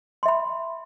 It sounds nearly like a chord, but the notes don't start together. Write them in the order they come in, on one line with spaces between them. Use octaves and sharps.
C6 E5 B5